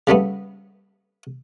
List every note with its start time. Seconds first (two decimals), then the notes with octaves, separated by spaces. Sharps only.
0.07 C#3 G3 A3 B3